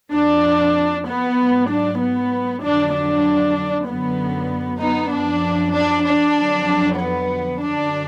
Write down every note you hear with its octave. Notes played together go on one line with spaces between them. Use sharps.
F2 F3 D4
B3
G#2 F#3
D4
B3
F2 D3 F#3 D4
D4
F#2 D3 F#3 B3
B3 D#4
F#2 F3 D4
D4
D4
F2 D3 F#3
B3
F#2 D3 F#3 D4